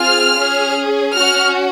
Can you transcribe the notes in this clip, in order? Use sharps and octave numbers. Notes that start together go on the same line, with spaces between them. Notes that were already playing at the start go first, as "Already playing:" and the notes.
Already playing: C4 F4 G#4 F6
C#4 G#4
C#4 F#4 F6